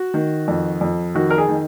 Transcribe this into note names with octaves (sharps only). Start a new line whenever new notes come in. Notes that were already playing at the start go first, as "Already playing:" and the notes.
Already playing: F#4
D#3
F2
F2
D#3 F#4
A#4
G#4
D#3